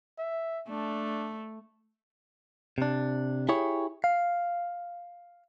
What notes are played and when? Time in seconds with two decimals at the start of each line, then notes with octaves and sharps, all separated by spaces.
0.18 E5
0.70 A3 D4
2.78 C3 D4
3.49 E4 G4 G#4 C#5
4.04 F5